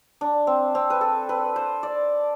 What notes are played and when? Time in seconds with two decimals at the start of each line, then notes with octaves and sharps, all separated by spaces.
0.21 D4
0.47 C4
0.75 C4
0.90 B4
1.01 A4
1.29 B4
1.56 C5
1.83 D5